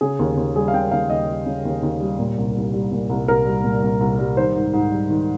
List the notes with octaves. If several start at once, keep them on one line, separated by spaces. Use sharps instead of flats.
C#3 G#4
D#2
D#2
G3 G#4
F5
C#3 G5
D#2 F5
D#2 D#5
G3
C#3
D#2
D#2
G3
A#2
C2
C2
G3
A#2
C2
C2 A#4
G3
A#2
C2
C2
G3
D#3 C5
G#2
G#2
G3
D#3